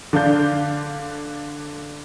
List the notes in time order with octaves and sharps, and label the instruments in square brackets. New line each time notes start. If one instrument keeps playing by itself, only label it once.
[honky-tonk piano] D3 D4 F5 G6